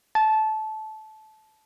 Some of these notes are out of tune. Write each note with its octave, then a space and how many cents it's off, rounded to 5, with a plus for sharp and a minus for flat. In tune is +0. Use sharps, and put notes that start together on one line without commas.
A5 -20